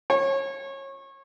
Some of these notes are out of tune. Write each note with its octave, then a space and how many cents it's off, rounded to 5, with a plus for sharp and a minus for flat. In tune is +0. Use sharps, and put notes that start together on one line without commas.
C#5 -25